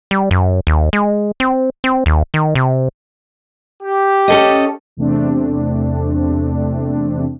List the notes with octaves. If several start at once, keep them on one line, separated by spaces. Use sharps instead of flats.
G3
F#2
D#2
G#3
C4
C4
D#2
D#3
C3
G4
C#4 A4 D#5
E2 C3 A3 C4 D4